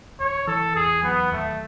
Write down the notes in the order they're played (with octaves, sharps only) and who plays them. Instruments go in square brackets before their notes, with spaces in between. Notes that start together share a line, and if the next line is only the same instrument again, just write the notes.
[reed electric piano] D#2 [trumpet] C#5
[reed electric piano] E3 [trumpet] A4
[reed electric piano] E2 [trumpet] G#4
[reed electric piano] F#3 [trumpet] B3
[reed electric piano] D#2 [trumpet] A3